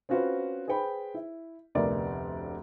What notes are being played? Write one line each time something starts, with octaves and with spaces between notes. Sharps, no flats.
C4 C#4 F4 F#4 B4 C5
G#4 B4 C5 G5 B5
E4
F1 D2 B3 A#4 D5 E5